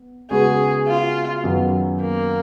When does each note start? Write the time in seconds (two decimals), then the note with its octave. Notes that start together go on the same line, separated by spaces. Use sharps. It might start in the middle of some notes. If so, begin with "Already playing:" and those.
Already playing: B3
0.31 C#3 G#3 B3 F#4 G#4
0.88 F4
1.44 F#2 D#3 F#3 B3
2.01 A#3